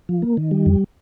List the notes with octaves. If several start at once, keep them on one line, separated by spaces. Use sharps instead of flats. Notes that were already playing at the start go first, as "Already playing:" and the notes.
F3
A#3
D#3
G3
F2